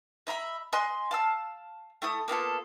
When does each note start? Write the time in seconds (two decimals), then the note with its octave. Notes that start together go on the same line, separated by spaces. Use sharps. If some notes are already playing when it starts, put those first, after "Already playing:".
0.27 D#5 E5 A#5 B5
0.73 D#5 G#5 C6 F#6
1.11 F5 A5 E6
2.02 A3 E4 D#6
2.28 A#3 B3 F4 A4